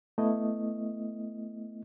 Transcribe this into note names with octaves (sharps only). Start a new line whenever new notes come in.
A3 B3 E4 D#5